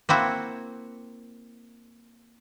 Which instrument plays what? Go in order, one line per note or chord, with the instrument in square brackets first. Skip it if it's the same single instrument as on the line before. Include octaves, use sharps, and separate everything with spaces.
[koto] A#3 C4 E4 F#4